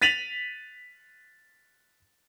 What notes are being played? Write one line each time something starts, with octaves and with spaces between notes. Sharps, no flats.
A6 B6 D#7 F7 F#7